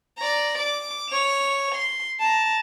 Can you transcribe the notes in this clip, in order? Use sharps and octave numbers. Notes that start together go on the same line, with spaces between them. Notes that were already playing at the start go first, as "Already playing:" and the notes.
D5 A#5
D6
C#5 F7
C6
A5 A#5